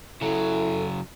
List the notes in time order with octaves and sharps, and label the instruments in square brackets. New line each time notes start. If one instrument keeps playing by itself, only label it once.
[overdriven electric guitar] C#3 F#3 [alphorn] E4 [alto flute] A4